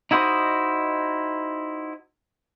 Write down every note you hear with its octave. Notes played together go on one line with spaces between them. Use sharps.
D#4 E4 F#4 C5 D#5